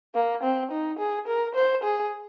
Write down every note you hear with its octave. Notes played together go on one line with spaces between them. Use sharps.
A#3
C4
D#4
G#4
A#4
C5
G#4